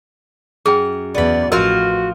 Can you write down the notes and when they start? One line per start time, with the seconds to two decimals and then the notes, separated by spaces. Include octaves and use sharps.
0.66 F#2 G#4 G5
1.14 E2 B3 D5 B5
1.52 A1 F3 F4 F#4 A#4 D#5